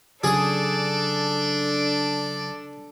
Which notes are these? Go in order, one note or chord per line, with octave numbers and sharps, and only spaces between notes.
C#3 F#3 D4 G#4 A4 D5 D#6